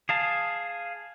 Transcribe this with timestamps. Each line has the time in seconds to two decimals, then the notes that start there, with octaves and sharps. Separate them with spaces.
0.09 G#4 F5 A5